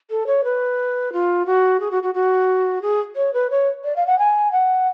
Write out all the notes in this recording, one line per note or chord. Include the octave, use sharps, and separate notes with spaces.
A4
C#5
B4
F4
F#4
G#4
F#4
F#4
F#4
G#4
C#5
B4
C#5
D5
F5
F#5
G#5
F#5